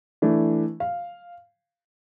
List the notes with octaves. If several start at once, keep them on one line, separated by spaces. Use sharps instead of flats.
E3 A3 D4
F5